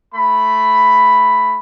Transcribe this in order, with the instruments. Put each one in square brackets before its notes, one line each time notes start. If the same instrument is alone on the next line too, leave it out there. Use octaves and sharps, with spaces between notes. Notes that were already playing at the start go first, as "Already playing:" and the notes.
[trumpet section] A3 B5